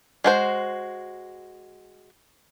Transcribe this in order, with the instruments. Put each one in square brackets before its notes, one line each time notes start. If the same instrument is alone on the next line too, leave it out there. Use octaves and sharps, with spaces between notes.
[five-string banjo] G#3 F#4 C5